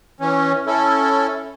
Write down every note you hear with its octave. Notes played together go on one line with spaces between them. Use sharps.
E3 C#4
C#4 E4 A4